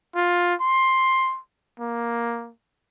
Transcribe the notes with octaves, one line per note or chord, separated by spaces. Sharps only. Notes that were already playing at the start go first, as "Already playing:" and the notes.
F4
C6
A#3